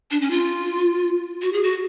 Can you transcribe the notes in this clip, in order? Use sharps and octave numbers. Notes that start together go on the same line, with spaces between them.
D4
C#4
F4
F#4
G#4
F#4